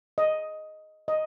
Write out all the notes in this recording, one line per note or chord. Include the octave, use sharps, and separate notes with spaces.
D#5
D#5